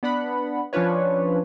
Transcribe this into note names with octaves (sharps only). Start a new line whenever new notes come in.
B3 D4 F#5 B5
F3 C#4 D4 F4 B4 C#5